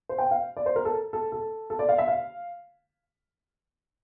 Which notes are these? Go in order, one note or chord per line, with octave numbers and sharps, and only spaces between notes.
C5
G5
F5
D5
C5
A#4
A4
A4
A4
A4
D5
F5
E5
F5